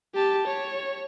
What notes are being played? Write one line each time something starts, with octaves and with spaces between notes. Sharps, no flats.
G4 A5
C#5